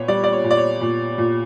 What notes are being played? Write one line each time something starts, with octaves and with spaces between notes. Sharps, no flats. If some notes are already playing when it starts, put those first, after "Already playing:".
Already playing: A#2 B3 C#5
G3 D5
D5
C#5
A#2
D5
C#5
A#2
A#2